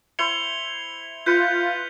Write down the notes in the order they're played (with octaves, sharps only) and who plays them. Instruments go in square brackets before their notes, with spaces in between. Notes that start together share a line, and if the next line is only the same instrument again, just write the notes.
[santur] E4 C5 [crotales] C#7 F7 G7
[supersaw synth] F4 [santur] B4 [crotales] G6 B6 C#7